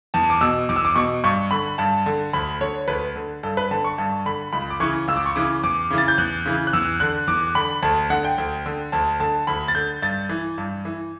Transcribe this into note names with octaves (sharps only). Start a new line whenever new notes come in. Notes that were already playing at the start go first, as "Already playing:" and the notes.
E2 A5
D6
B2 E6
E2 D6
E6
D6
B2 C#6
G2 C#6
D3 B5
G2 A5
D3
D2 B5
D3 C#5
D2 B4
D3
G2 A4
B4
D3 A5
C#6
G2 A5
D3 B5
C#2 B5
D6
C#3 E3 C#6
C#2 E6
D6
C#6
C#3 E3 D6
E2 D6
C#3 E3
A6
G6
E2 F#6
C#3 E3
F#6
E2 E6
D3 F#6
E2 D6
D3 B5
D2 A5
D3 F#5
G5
D2
D3
D2 A5
D3 A5
D2 B5
A6
D3 G6
G2 A6
E3
G2
E3